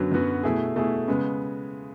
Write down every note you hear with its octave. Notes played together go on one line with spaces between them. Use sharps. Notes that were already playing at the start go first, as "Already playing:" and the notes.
Already playing: F#2 D3 F#3 B3 F#4
F#2 D3 F#3 B3 F#4
B2 A3 E4 G#4
B2 A3 E4 G#4
C#3 G#3 B3